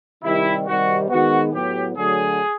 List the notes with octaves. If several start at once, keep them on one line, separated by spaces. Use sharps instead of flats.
C3 D#3 G3 E4
C3 D#3 G3 F#4
D#3 G#3 B3 F#4
A2 F#3 B3 G4
D3 F#3 A3 G#4